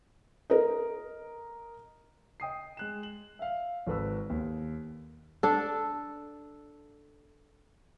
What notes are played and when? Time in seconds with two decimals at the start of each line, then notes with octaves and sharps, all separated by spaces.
0.50 A#4 D#5
2.40 D#5 G5 D#6 C7
2.77 G#3 F#6 E7
3.03 F#7
3.39 E5 F5
3.87 G#1 A4 B4 E6
4.30 D#2
5.43 D4 A4